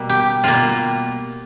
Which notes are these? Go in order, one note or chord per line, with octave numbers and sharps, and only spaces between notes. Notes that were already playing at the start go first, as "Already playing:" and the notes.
Already playing: B2 G3 A#3
G4
B2 G3 A#3 F4